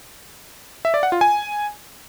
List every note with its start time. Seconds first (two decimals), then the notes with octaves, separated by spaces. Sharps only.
0.85 E5
0.94 D5
1.03 F#5
1.12 F4
1.21 G#5